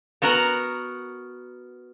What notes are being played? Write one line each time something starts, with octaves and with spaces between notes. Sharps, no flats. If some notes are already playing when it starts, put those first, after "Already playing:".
B3 F#4 A#4 F#5 A#5